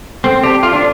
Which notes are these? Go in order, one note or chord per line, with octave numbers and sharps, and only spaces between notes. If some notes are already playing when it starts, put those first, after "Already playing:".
C4 A4
G4 D5 A5
F4 A4
D4